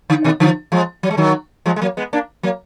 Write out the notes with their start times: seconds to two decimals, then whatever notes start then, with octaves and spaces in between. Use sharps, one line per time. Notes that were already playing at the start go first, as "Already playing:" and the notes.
0.10 D3
0.24 B2 D#3
0.40 D3 F3
0.72 F3 G#3
1.03 F#3
1.11 G#3
1.17 D#3 F#3
1.66 F3 G#3
1.76 G#3
1.82 F#3 A#3
1.97 G#3 B3
2.13 A#3 D4
2.43 F#3 A#3